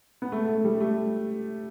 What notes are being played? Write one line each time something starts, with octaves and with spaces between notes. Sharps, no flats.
B3
A3
A3
G3
A3